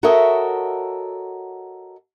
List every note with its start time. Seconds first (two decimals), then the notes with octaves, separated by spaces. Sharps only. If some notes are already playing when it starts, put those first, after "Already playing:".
0.03 F#4 A4 A#4 C#5 D#5 E5